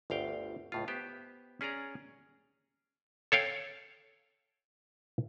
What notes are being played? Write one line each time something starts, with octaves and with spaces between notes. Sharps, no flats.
G1 D2 F5 G5
C#2 A2 F4
B3 G4 C5
C#4 G#4 D5 A#5
A4 C#5 F5 G5